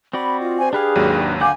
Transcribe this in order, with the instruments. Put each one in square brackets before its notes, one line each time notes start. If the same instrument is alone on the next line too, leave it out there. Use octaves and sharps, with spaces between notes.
[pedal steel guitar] C4 F#4 D5 [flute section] B5
[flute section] F4 D#5
[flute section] C5 [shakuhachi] G#5
[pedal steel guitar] D4 B4 F5 [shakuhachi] G4 [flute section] G#4
[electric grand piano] G#1 D#2 F#3
[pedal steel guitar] D3 F#5 G6 [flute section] F5 D6 [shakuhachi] G#5